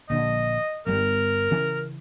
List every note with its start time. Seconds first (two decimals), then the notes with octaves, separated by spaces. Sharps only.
0.10 A#1 D3 D#5
0.86 G1 G3 A#4
1.51 C#3 E3 C#4